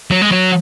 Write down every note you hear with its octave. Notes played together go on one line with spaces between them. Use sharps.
F#3
G#3
F#3